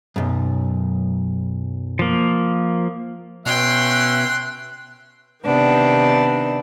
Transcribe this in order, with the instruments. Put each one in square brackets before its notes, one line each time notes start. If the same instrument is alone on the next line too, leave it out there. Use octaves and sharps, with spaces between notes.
[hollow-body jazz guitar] B1 F#2
[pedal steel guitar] F3 A#3
[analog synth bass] B2 [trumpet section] C#4 E5 [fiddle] G5 C6 [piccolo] F#6
[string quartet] C3 D#3 B3 D4